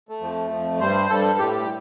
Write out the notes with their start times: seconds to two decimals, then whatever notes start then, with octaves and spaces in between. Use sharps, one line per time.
0.09 A3
0.21 F2 F3
0.51 F2 F3
0.80 G2 G3 C5
1.10 G2 G3 A4
1.39 A2 G3 G4